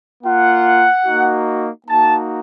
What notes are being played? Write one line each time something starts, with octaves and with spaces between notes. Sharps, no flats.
A#3 F4 F#5
A#3 D#4 F#4
A#3 D#4 F#4 A5